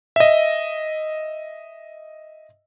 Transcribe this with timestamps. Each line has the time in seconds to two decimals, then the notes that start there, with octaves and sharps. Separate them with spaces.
0.16 D#5 E5